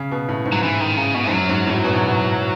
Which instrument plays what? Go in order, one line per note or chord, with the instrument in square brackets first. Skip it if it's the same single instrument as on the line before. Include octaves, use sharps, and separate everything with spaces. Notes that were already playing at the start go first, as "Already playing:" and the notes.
Already playing: [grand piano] C#3
B2
A2
G#2
[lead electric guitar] F#3
[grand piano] G#2 [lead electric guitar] E3
[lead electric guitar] D#3
C#3
B2
[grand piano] G#2
[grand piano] F#2 [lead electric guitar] F#3
[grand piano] G#2
A2
B2
G#2
A2